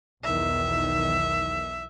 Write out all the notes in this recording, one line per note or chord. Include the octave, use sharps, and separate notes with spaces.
B1 E2 D#3 E5